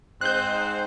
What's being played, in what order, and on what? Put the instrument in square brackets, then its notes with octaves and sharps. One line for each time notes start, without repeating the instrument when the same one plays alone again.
[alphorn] G#2 [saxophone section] C4 D#4 C5 [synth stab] F#6 G6